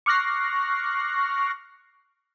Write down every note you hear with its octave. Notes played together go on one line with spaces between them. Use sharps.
C#6 D6 F6 F#6 A#6 C7